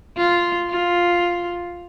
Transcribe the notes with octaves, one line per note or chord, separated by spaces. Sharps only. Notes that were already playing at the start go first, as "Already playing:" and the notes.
F4
F4